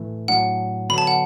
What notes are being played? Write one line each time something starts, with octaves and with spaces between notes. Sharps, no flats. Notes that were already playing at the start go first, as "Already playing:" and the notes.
Already playing: A2 E3 A3
A2 F#3 D4 F#5
D3 F#3 B3 D4 F#4 B5
A5
F#5